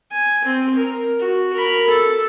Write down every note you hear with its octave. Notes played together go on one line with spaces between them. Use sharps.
G#5
C4
A#4
F#4
A#4 B5
A4